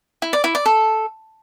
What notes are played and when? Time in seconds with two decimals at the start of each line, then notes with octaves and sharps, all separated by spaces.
0.22 E4
0.33 D5
0.44 E4
0.55 D5
0.66 A4